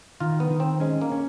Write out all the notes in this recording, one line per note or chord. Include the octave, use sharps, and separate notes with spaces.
D#3 F4
B3
D#3
C4
G#3 C#4
A#3
C#4